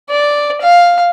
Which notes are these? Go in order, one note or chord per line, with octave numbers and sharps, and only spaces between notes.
D5
F5